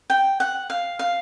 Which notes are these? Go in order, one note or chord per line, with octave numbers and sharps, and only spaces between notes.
G5
F#5
F5
F5